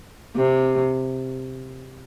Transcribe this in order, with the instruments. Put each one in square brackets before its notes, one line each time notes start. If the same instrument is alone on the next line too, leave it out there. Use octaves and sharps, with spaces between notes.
[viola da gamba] C3